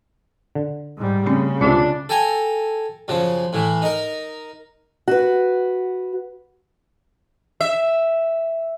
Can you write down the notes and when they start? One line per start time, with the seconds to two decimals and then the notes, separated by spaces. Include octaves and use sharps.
0.55 D3
0.97 G#2 G3
1.26 C#3 A3 C4 C#4
1.61 C#2 C3 C#4 D4 F4
2.09 A4 G5 G#5 A#5
3.08 F#2 C#3 F3
3.53 A2 E3
3.82 D#4 A#4
5.08 F#4 B4
7.61 E5